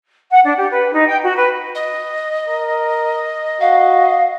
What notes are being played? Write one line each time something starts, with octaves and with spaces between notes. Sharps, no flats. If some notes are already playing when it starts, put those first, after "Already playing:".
F#5
D4
G4
B4
D#4
G5
F#4
B4
D#5
A#4
F#4 F5